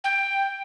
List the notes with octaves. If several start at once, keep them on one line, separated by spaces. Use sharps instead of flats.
G5